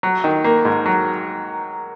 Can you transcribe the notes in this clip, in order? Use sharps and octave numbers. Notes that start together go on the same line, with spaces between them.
F#3
D#3
A#3
G#2
F#3